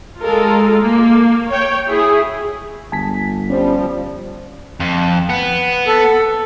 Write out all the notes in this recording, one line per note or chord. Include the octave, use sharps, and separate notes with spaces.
G#3 F4 A4 A#4
A#3
C#5 G5
E4 G#4
G1 G#5 A5 B6
F3 G3 C#4
F2
B3
A4